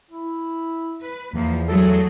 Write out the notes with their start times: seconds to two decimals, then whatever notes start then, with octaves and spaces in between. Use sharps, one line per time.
0.11 E4
1.01 B4
1.33 E2 F3 A#3
1.68 F#3 A3 G#4 A4